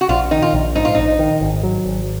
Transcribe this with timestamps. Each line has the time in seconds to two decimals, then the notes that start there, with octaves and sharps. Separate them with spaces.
0.01 F#4
0.09 A#1 F4
0.31 D#3 D#4
0.42 F4
0.53 A#1
0.75 G#2 D#4
0.85 F4
0.95 A#1 D#4
1.19 D#3
1.41 G#1
1.63 F#3
1.86 G#1